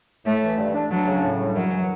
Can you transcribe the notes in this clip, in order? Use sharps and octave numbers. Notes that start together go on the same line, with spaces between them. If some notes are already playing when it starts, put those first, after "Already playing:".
A2 A3
E3
G2
D4
F#3 D4
C#3
A2
G3
F#2 F#3
E3